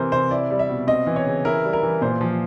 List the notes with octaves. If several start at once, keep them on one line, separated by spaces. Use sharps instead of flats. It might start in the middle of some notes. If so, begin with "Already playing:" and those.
Already playing: C3 E3 A#4 C5
C3 C5
E4 D5
G3
E5
B2
C4 D#5
E3
C#5
C#3
E4 A#4
G3
A#4
E3
A#2 C5
F3